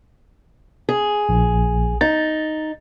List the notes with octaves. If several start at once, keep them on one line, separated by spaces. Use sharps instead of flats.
G#4
A#1
D#4 A6